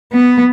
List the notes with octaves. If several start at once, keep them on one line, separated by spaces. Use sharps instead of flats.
B3